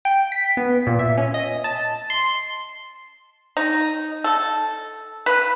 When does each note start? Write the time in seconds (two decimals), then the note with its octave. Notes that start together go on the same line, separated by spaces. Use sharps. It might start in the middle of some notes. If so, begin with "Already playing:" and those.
0.05 G5
0.32 B6
0.57 B3
0.87 A#2
0.99 E5
1.18 C#4
1.34 D#5
1.64 A5
2.10 C6
3.57 D#4
4.24 A4
5.26 B4